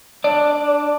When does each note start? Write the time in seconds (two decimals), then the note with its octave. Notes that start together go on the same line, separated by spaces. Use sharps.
0.24 D4 D5